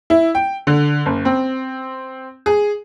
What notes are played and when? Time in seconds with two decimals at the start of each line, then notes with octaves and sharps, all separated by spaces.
0.10 E4
0.35 G5
0.67 D3
1.06 F#1
1.25 C4
2.46 G#4